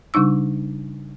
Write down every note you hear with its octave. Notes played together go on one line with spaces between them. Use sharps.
C#3 G3 D4 D#4 E6